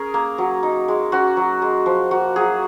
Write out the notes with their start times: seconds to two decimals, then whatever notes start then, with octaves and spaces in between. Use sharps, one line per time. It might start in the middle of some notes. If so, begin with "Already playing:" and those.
Already playing: C#4 G#4 A#4
0.14 A#3
0.38 F#3
0.63 D#4
0.88 G#3
1.12 C#4 F#4
1.37 F#3
1.62 G#3
1.86 F3
2.11 A#3 F#4
2.36 F#3 G#4